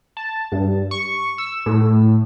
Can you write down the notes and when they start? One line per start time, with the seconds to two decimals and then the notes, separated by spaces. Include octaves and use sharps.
0.17 A5
0.52 G2
0.91 C#6
1.38 E6
1.66 A2